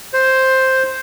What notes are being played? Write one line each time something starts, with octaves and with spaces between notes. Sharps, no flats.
C5